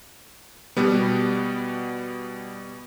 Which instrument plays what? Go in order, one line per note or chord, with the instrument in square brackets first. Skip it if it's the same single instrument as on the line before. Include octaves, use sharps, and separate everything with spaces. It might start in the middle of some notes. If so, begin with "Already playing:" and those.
[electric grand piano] B2 G3 B3